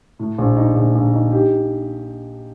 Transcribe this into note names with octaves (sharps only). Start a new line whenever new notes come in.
A2
A#1
D#4
A#1
A#1
D#4
D#4 G4